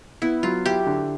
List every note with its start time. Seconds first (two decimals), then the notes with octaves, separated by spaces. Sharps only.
0.22 B3 E4
0.43 F#3 F4
0.65 E4 G4
0.86 D3